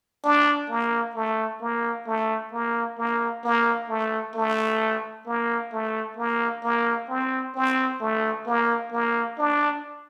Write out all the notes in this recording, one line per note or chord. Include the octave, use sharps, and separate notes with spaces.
D4
A#3
A3
A#3
A3
A#3
A#3
A#3
A3
A3
A#3
A3
A#3
A#3
C4
C4
A3
A#3
A#3
D4